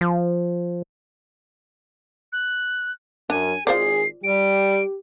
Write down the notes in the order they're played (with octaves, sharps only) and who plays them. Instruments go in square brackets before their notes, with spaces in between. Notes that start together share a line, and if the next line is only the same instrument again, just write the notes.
[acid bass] F3
[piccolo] F#6
[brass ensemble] F#2 [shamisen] D4 [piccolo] G#5
[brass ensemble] G#1 G#4 [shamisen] F4 C5 D5 [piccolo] C7
[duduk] G3 [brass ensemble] G4 [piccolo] D7